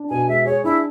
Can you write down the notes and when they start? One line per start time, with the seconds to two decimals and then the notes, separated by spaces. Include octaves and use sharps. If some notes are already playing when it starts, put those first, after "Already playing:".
Already playing: D4
0.10 B2 G#5
0.28 G#3 E5
0.45 G#4 C#5
0.64 D4 E4